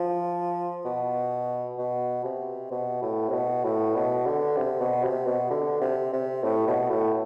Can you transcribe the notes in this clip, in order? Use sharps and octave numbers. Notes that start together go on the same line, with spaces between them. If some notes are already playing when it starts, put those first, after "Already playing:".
Already playing: F3
B2
B2
C3
B2
A2
C3
B2
A2
B2
D3
C3
B2
C3
B2
D3
C3
C3
A2
B2
A2